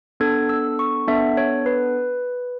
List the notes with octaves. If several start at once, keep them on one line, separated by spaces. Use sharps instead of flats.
B3 D4 A4 G#6
E6
C#6
B3 D4 A4 E5
C#5
B4